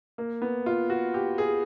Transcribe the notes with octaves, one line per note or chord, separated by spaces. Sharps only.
A#3
B3
F4
F#4
G4
G#4